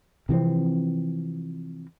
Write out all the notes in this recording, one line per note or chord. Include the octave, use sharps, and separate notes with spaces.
C3 E3 F3 C4